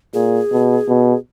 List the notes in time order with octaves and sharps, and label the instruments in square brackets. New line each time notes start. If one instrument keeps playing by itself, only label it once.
[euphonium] A#2 [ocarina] G#4
[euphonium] B2
B2